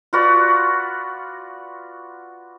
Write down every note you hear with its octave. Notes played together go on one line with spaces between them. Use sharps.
F4 F#4 B4 D5